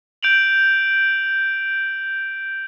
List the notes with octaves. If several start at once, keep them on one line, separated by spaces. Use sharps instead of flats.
G6 D7 F7 F#7